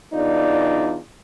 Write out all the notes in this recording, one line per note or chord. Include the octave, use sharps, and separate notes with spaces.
E2 D4 D#4 F4 D5